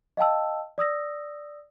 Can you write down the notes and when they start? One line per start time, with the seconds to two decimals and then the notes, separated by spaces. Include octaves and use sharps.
0.17 D#5 F5 G5 A5 E6
0.78 D5 D#6 E6 A#6